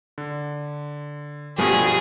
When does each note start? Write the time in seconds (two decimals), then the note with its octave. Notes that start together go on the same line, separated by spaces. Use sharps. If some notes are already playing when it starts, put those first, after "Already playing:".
0.18 D3
1.58 G2 B2 F3 A3 G4 G#4